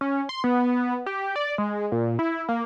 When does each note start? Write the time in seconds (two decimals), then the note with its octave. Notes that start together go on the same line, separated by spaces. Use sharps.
0.01 C#4
0.29 C6
0.44 B3
1.06 G4
1.36 D5
1.58 G#3
1.92 A#2
2.19 E4
2.49 A#3